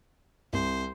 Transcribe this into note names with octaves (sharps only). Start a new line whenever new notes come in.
C2 C5